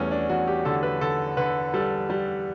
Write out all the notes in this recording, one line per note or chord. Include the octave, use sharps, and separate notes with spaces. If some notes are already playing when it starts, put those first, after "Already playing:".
Already playing: E2 G3 A3 B3 C#4
D4
E2 F#4
G4
D3 A4
B4
D3 A4
D3 B4
G3 A4
G3